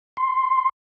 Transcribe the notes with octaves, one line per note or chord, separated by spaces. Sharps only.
C6